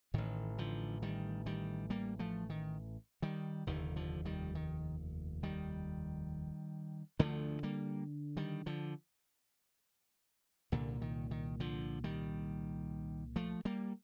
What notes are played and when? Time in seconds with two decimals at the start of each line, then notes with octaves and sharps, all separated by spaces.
0.14 A1 A2 D#3
0.58 D3 F3
1.02 D#3 G3
1.46 D#3 G3
1.90 G3 A#3
2.19 F3 A3
2.50 D#3
3.22 D#3 G3
3.67 F1 D#2 D3 D#3
3.96 D3 F3
4.25 D#3 G3
4.55 D#3
5.43 D#3 G3
7.19 D2 D3 F3 A3
7.63 G3 A#3
8.37 D#3 G3
8.66 D3 F3
10.72 C2 A#2 D3
11.02 D#3
11.31 D#3
11.60 D3 F3
12.04 D#3 G3
13.36 F3 A3
13.65 G3 A#3